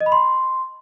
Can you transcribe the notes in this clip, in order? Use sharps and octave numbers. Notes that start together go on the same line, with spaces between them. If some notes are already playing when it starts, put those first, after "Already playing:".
D#5
B5
C6